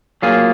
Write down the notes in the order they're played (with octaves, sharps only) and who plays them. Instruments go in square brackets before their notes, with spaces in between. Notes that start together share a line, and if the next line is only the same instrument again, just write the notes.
[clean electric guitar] F#3 A#3 F4 G#4